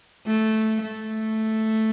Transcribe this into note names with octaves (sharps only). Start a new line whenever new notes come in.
A3
A3